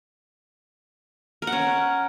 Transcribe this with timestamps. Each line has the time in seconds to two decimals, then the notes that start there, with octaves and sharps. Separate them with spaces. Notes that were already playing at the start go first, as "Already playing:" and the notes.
1.42 A#4
1.47 F#5
1.52 C#4